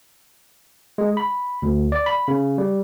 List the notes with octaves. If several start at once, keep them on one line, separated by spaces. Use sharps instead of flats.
G#3
B5
D2
D5
B5
C#3
G3